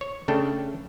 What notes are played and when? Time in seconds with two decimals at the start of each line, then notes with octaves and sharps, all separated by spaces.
0.01 C#5
0.28 C#3 A3 D4 A4 G5